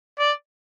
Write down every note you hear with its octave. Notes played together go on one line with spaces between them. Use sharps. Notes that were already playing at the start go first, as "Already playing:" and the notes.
D5